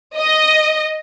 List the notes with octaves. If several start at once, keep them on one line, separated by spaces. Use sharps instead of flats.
D#5